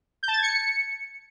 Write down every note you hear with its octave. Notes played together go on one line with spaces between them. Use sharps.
G6
A5
A6
G#6
C#7